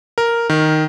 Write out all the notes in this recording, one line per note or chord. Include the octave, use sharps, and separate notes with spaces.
A#4
D#3